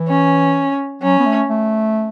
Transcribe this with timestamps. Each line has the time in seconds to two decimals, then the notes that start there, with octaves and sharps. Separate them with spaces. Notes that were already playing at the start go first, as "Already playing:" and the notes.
Already playing: E3
0.08 C#4
1.02 F#3 C#4
1.20 B3
1.26 A3
1.49 A3